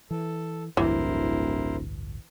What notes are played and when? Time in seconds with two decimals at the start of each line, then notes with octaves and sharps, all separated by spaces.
0.11 E3 A4
0.77 D1 A1 D2 G2 E3 E4 A#4 C5